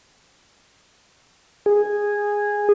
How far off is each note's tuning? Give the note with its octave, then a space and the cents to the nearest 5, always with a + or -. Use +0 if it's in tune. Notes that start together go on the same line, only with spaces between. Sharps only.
G#4 -10